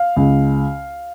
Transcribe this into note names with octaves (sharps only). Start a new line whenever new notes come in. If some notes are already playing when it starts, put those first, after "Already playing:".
Already playing: F5
C#2